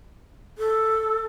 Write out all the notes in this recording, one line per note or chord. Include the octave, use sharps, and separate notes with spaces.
A4